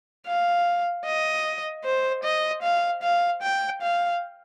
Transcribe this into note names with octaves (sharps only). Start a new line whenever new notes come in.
F5
D#5
C5
D#5
F5
F5
G5
F5